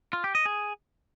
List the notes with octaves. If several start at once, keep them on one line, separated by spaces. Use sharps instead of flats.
F4
G4
D#5
G#4